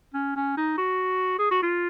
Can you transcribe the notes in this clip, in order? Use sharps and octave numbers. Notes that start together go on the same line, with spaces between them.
C#4
C#4
D#4
F#4
G#4
F#4
F4